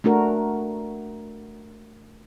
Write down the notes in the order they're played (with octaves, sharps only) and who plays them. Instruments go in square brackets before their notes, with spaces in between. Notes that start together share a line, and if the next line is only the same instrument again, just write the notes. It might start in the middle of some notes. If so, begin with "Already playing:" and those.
[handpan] A3 D4 F#4 A#4